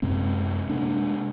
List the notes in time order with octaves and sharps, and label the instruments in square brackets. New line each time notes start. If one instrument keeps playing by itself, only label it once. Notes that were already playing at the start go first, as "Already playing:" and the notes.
[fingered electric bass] F#2 C3 G#3 C4
C3 G#3 A#3 D4